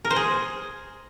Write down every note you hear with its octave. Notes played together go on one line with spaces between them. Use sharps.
A#4
C5
G#4